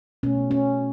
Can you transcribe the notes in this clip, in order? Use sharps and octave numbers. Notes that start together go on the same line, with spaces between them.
B2 A3 C#4
C#4